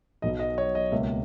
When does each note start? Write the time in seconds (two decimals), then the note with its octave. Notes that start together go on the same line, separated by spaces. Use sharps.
0.22 B1 B2 F#3 D#5
0.39 D#5
0.58 C#5
0.75 D#5
0.92 C#2 B2 A#3 E5